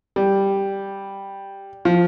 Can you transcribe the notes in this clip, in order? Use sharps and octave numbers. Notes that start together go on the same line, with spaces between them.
G3
F3